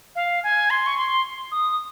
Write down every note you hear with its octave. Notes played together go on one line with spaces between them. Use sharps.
F5
G#5
C6
C#6
C6
D#6